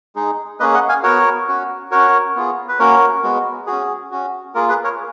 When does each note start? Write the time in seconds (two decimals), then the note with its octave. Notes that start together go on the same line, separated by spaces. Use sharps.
0.15 G#3 D#4 G#4
0.60 A#3 C#4 G#4 B4 D#5
0.74 D#5 F#5
0.89 F5 G#5
1.03 B3 F#4 A#4 C#5
1.48 C#4 F#4
1.91 C#4 F#4 A#4 C#5
2.35 B3 F4 G#4
2.68 B4
2.79 A#3 C#4 F#4 A#4 C#5
3.23 G#3 B3 F#4
3.67 C#4 F#4 G#4
4.11 C#4 F#4
4.55 A#3 F4 G#4 A#4
4.69 G#4 B4
4.84 A#4 C#5